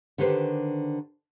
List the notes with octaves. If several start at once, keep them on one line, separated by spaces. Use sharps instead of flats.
D3 D#3 G4 B4 C5